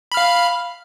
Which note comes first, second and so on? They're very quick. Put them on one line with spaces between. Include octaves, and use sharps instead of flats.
B5 F6 F5